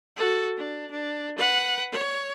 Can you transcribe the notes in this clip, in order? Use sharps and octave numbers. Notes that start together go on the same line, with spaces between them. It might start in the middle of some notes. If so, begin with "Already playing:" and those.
F#4 A4
D4
D4
B4 F#5
C#5